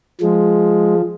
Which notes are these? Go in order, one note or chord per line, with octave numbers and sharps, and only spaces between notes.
F3 G#3